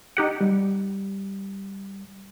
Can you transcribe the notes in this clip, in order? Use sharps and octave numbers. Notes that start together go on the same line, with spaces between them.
D#4 G4 F#5
G3